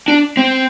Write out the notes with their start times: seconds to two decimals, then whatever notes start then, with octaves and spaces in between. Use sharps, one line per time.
0.08 D4
0.37 C4